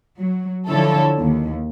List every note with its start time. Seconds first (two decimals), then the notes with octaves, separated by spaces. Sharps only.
0.17 F#3
0.68 D3 F3 E4 A4 C#5
1.19 D#2